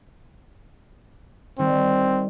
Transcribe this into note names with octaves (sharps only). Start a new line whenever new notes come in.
D#3 G3 C4